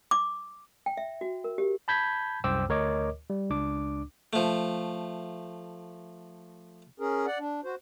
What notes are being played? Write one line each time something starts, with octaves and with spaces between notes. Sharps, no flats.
D6
G5
E5
F#4
A#4
G4
A5 B5 G6 G#6 B6
C2 F#2 C5 G5 D6 E6
D2 A#4 C#5 D#5 D6
G3
C#2 D4 D6
F3 A3
C#4 G#4 A#4
D5 F#5
D4
F#4 C5